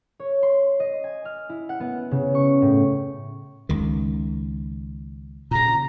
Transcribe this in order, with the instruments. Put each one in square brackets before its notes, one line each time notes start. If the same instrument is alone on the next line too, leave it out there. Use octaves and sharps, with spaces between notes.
[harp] C#5
C6
D#5
G#5
F6
E4
F#5
B3
C#3
C#6
A2
[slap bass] C#2 D#3
[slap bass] A#2 C#3 [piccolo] A#5